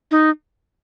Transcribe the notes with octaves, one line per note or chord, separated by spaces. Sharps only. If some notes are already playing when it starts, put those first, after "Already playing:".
D#4